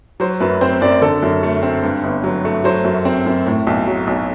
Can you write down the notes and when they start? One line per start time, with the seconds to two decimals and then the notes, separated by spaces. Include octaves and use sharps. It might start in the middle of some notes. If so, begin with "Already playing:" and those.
0.20 F#3 C5
0.40 F#2 B4
0.61 C4 C5
0.81 F#2 D5
1.02 D3 A4
1.23 F#2
1.43 A3
1.63 C4
1.83 G2
2.04 G1
2.24 F#3
2.45 A3
2.64 F#3 C5
2.84 F#2
3.05 C4
3.26 F#2
3.46 A2
3.67 B1
3.87 F#3
4.07 B1